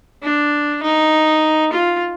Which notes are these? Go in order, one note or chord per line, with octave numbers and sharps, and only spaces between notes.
D4
D#4
F4